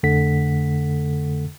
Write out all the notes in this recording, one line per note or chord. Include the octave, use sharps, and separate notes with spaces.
F2 D3 A3 A4 F#5 B6